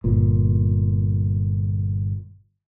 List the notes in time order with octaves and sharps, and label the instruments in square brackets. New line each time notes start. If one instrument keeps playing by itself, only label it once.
[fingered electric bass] G1 A#2